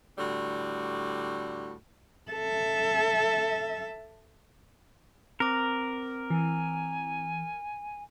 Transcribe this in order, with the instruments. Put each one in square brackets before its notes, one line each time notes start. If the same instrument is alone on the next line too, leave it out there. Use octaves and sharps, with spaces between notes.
[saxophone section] A2 D3 G3 F#4
[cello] A4 E5
[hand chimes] C4 D6 [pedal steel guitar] A#4
[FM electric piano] E3 [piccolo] G#5